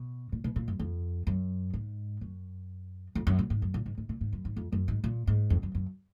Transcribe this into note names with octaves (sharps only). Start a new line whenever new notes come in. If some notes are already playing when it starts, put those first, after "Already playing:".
Already playing: B2
A#2
B2
A#2
F#2
F2
F#2
G#2
F#2
F2
F#2
A#2
G#2
F#2
A#2
G#2
G#2
A#2
G#2
F#2
G#2
F2
F#2
G#2
A#2
G#2
F2
F#2
F#2